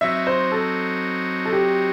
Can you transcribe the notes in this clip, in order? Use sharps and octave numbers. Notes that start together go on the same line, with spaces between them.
F#3 C4 D#4 F#4 E5
C5
A4
A4
G4